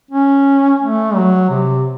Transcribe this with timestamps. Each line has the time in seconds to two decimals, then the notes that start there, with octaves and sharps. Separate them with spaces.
0.11 C#4
0.81 A3
1.15 F#3
1.50 C3